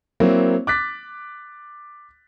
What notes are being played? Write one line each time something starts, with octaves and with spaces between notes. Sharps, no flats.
F#3 A#3 C4 E4
D6 F#6 A6 B6